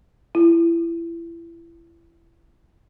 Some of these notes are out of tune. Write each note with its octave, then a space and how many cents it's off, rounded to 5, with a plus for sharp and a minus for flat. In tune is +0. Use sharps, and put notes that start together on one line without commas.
E4 +30